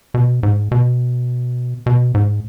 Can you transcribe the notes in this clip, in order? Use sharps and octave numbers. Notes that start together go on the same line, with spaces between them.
B2
G#2
B2
B2
G#2